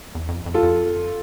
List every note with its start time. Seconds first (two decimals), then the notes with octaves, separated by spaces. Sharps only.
0.15 E2
0.28 F2
0.46 F2
0.54 F4 A4
0.63 F2